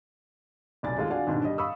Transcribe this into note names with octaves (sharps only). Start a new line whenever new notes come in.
F1 B1 D5 G#5 A6
D#2 G#3 A3 F4
D4 F#4 D5 F5 F#5 G#5
D#2 G#2 B2 D3
G3 D#5
F5 B5 C#6 D#6 E6